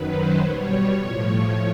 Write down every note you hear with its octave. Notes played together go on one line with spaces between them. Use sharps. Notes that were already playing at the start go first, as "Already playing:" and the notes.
Already playing: F#2 D#3 F#3 B4
C5
B2 G3 C#5
A2 F3 C#5